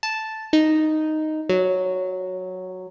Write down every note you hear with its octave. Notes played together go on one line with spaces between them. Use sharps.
A5
D#4
F#3